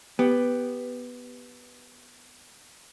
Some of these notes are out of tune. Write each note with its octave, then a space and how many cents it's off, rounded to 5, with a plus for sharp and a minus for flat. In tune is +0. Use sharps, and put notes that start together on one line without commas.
B3 +0 G4 +5